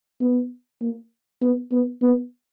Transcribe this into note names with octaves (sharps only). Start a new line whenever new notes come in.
B3
A#3
B3
B3
B3